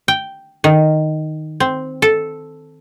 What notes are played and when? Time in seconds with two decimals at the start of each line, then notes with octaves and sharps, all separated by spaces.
0.08 G5
0.64 D#3
1.60 C4
2.02 A4